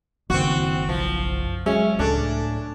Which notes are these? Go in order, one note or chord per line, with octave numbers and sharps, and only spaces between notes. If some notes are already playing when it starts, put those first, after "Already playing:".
F#1 D#3 C4 F#4
B1 F3
F#3 G#3 C#4 E5
C#2 A2 D4 A4